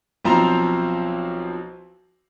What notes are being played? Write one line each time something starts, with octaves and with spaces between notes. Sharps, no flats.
B1 F3 C4 C5 A#5 F7